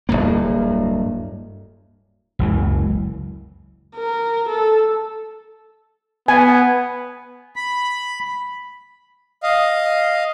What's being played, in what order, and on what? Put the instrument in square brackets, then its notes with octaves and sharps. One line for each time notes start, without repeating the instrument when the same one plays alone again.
[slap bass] D1 C#2 G2 A#3
F#1 C#2 E3
[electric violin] A#4
A4
[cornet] B3 [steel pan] G#5
[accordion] B5
[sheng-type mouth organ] D#5 F5